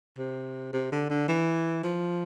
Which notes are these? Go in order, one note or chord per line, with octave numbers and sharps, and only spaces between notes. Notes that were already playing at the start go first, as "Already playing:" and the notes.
C3
C3
D3
D3
E3
F3